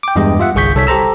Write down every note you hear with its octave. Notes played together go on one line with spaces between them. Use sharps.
G5 D6
E2 G2 G#3 G4 D#5
F4 E5 F#5
G1 C2 G#4 C#6 G6 B6
C2 A4 C#5 B6
G4 A4 C5 A#5 E6